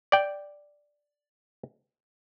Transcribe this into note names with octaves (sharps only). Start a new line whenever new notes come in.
D5 G5